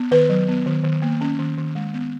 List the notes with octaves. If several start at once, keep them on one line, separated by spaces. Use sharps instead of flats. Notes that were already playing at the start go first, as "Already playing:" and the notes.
Already playing: B3
D#3 B4
F#3
B3
D#3
D#3
A#3
C#4
D#3
D#3
G#3
B3